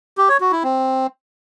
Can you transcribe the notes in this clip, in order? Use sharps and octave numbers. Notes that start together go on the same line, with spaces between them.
G4
C#5
F#4
E4
C4